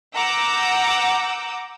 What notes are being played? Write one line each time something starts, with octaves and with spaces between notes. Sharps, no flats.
F#5 A#5 D6 E6 G6